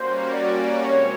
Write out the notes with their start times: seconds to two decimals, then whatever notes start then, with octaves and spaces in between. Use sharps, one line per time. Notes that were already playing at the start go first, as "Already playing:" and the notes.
Already playing: G3 A#3 C#4 F#4 C5
0.33 D5
0.85 C3 F3 G#3 C4 C#5